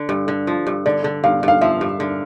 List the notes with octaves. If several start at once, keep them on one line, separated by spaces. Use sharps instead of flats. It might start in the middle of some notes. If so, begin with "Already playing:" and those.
Already playing: D3
G2
D3
F3
G2
D3 D5
D3
G2 F5
G2 F5
F3 E5
G2
D3